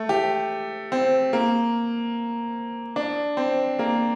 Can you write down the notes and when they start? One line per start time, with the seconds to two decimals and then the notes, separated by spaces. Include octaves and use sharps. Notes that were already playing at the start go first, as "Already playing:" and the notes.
Already playing: A3
0.09 G4
0.92 C4
1.33 A#3
2.96 D4
3.37 C4
3.79 A#3